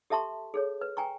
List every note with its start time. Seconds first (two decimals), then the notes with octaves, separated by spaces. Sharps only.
0.10 G4 A4 E5 A5 C6 C#6
0.54 G#4 A4 C#5
0.81 B4
0.97 G5 G#5 A#5 C#6